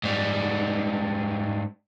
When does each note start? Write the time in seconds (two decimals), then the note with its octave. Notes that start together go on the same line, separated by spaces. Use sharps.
0.03 G#2 G3